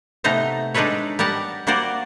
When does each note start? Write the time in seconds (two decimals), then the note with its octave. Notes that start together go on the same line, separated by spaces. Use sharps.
0.24 C3 A3 B3 D#4 C5 A#5
0.74 G#3 D4 D#4 A4 B4 C#5
1.19 G3 B3 A#4 F#5 A5
1.67 G3 A#3 F#4 A#4 C5 D5